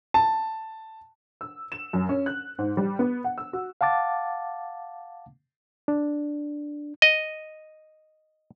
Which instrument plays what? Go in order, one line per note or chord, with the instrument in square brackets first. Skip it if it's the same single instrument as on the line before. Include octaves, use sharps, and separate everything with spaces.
[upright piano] A5
[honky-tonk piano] E6
E7
F#2
C#4
F#6
G#2
G3
B3
F#5
E6
F#4
[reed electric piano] F5 F#5 A5 D6 A6
D4
[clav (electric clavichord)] D#5